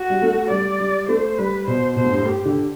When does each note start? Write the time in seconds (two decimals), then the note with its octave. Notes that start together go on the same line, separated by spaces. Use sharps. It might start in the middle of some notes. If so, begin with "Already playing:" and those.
Already playing: F#4
0.10 G3
0.22 A3
0.50 G3 D5
0.80 G3
1.09 A3 C5
1.38 G3 B4
1.67 B2 C5
1.96 B2 C5
2.04 A2
2.10 G2
2.18 A2
2.26 G4
2.45 D3